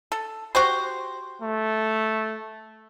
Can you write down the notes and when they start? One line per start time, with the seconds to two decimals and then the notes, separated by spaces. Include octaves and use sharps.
0.12 A4
0.55 F#4 G4 C5
1.42 A3